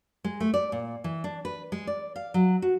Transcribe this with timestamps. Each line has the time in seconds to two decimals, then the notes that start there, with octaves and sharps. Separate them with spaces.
0.24 G#3
0.40 A3
0.54 D5
0.72 A#2
1.04 E3
1.24 D4
1.45 B4
1.72 G#3
1.87 D5
2.16 F5
2.34 F#3
2.62 F#4